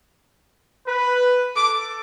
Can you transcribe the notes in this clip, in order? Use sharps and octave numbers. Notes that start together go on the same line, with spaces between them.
B4
A4 D6